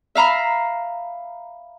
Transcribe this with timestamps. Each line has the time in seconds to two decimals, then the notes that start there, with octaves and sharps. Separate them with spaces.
0.15 E5 F5 A#5 B5